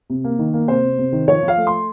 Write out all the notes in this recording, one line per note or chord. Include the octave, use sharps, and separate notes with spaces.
C3
A#3
D#3
A#3
C3 C5
C3
C3
D#3
F3 C#5
F3
F5
A3
C6